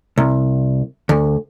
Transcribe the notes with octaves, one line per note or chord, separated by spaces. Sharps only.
C2
D2